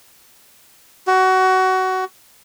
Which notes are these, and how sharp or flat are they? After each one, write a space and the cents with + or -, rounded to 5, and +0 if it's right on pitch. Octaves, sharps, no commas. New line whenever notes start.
F#4 +20